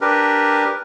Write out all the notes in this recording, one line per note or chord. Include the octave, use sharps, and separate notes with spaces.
D4 G4 A#4 B4